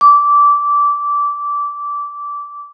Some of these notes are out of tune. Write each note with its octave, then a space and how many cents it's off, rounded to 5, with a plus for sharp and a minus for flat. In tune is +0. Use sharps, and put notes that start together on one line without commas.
D6 -15